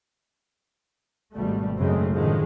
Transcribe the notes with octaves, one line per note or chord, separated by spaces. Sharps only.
G#1 B2 G3 A3
F#1 F#2 C#3 G#3 A3 C4
F#2 A2 D3 D#3 F3 G#3